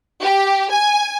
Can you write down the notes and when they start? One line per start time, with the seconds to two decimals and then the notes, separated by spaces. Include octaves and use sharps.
0.22 G4
0.71 G#5